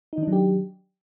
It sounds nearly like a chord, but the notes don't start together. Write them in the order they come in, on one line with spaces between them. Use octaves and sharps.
D#4 D#3 D4 F#3 G4